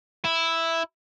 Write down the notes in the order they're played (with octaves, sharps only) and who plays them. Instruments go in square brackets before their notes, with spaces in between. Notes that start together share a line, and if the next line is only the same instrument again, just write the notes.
[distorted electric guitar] E4